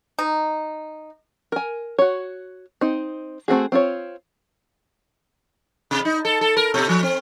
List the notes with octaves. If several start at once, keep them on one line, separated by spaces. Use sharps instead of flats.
D#4
A#4 G#5
F#4 C#5
C4 D#4
A3 C4 F#4 G#4
C4 F4 C#5
C3
D#4
A4
A4
A#4
B2
F3
C4